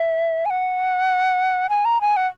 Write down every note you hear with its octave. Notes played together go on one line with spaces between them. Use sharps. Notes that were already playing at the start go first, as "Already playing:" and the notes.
Already playing: E5
G#5
F#5
G#5
A#5
G#5
F#5